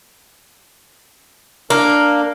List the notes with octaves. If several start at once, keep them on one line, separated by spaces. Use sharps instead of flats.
A#3 D4 A#4